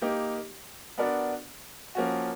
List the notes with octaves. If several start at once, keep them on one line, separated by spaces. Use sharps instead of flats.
A#3 D#4 G4
B3 D4 F#4 A#4 D5
F3 A#3 C#4 F#4